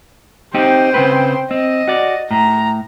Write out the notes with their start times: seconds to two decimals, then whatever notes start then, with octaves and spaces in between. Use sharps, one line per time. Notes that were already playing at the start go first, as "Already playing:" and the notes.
0.54 C4 D#4 G4 C5 G5
0.94 C#3 C4 B4
1.51 C4 D#5
1.88 F#4 D5
2.31 A2 A#5